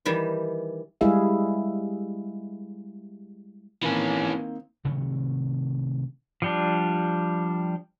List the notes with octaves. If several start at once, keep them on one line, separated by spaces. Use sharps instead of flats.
D#3 E3 G3
G3 G#3 E4 G#4 E5 F5
D#3 E3 A#3 C4 C#4
C3 D#3 F#3 A3
F3 G3 D4